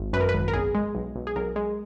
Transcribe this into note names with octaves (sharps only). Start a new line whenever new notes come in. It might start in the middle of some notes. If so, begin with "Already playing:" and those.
Already playing: G#1
F#2 B4
A#4
B4
G#1
A#4
B1 G#4
G#3
B1
B1
G#4
B1 A#4
G#3